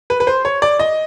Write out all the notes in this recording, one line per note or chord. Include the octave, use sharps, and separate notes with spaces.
B4
B4
C5
C#5
D5
D#5